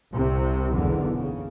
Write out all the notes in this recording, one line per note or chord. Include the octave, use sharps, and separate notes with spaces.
C2 C3
F#1 B1 E2 D3
C#3